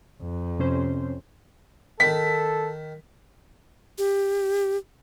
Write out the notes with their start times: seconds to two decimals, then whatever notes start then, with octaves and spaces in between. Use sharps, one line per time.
0.22 F2
0.59 C3 C#4 C5
2.00 D#3 A4 B6
3.98 G4